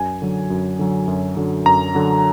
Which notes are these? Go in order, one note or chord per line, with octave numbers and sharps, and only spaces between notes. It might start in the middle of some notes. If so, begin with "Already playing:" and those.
Already playing: F#2 G#5
D3 F#3
F#2
D3 F#3
F#2
D3 F#3
F#2 A#5
D3 F#3